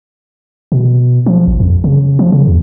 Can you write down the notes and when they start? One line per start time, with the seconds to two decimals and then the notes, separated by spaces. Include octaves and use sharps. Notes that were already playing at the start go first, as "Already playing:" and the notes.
0.72 B2
1.26 F3
1.48 A1
1.60 F2
1.84 C#3
2.19 F3
2.32 C#3
2.48 E2